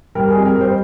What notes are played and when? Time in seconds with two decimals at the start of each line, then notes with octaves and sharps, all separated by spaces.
0.15 G3 A#4
0.30 G#4
0.36 F2
0.45 A#4
0.56 G3
0.61 C5